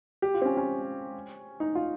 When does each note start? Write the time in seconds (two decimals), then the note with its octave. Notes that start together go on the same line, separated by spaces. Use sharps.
0.22 G4
0.34 F4
0.42 C4
0.45 C#4
0.57 C#4
1.60 D#4
1.75 F4